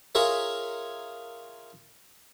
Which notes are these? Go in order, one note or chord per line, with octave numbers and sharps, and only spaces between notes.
F4 G#4 A#4 C#5 E5